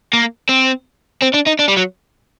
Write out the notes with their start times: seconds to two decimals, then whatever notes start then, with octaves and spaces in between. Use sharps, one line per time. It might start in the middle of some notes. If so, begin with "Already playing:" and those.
0.13 A#3
0.49 C4
1.22 C4
1.34 D4
1.46 D#4
1.59 D4
1.68 G3
1.77 F#3